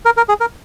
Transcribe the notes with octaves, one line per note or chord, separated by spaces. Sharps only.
A#4
A#4
G#4
A#4